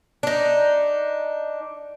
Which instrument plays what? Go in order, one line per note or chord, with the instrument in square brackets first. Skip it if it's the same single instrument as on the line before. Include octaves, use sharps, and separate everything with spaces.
[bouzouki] D4 D#4